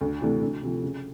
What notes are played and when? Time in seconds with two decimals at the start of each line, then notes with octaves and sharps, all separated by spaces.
0.01 D2
0.21 C3 E3 A3 D4
0.41 D2
0.63 C3 F3
0.83 C#3